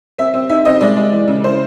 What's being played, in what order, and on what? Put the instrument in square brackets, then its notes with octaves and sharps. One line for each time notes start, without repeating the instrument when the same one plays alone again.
[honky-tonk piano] C4 E5
C4
D#4 E5
C4 D#5
G#3 D5
G#3
E3
C#3
E4 C5